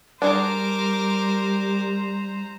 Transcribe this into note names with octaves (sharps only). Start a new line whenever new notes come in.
G3 D4 G#4 A#4 C5 A#5 D6